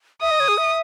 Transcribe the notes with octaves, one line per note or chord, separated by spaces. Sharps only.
E5 D#6
D#5
C#5
G#4
E5